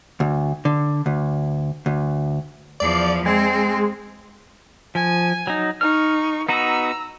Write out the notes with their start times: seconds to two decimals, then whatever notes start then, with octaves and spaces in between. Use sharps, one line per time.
0.20 D2
0.65 D3
1.06 D2
1.86 D2
2.80 E2 F3 D5
3.26 G#3 C4
4.95 F3 G#5
5.47 F#3 D#4
5.81 D#4 C#6 F6
6.49 B3 D#4 F#4 A#5 E6